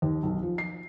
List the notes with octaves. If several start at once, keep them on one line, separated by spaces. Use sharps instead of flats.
D#2
B1
F3
C7